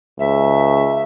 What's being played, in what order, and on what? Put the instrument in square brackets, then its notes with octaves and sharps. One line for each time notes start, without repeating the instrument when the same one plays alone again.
[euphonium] C#2 [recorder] E5